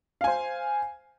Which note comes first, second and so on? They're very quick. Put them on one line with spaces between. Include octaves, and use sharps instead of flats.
F5 G#5 C5